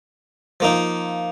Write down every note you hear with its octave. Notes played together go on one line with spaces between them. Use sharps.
F3 A#3 D#4